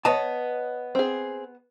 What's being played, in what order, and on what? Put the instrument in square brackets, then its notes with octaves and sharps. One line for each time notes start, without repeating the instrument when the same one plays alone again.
[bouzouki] B3 [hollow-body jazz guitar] C#5 D#5 A5
[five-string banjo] C4 G#4